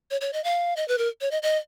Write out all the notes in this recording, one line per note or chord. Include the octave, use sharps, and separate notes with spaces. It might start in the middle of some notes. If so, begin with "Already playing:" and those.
C#5
C#5
D#5
F5
D#5
B4
A#4
C#5
D#5
D#5